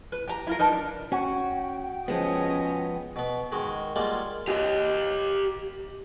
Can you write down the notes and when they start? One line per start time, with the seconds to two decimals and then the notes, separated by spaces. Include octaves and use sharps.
0.12 B4
0.28 G4 A#5
0.47 E4 F4 A#4
0.59 D#4 A#4 B4 A5
0.72 D4
1.12 C#4 F#4 G5
2.08 F3 G#3 B3 C#4 D#5
3.16 B2 B3
3.52 D#3 G#3 F#4
3.96 G3 G#3 A#3 F4 F#5
4.48 G4 D#5